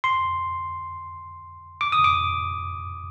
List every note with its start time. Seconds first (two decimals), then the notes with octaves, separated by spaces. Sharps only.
0.04 C6
1.81 D6
1.92 D#6
2.04 D6